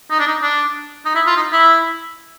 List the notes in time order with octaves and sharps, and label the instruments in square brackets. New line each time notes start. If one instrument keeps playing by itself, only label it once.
[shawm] D#4
D4
D#4
D4
D#4
E4
F4
D#4
E4